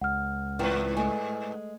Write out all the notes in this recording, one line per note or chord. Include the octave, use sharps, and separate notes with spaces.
C#2 F#5 F6
G#2 E3 C4 F4 B4
G#3 A3 G#5